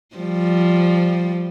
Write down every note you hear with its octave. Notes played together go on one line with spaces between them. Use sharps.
F3 G3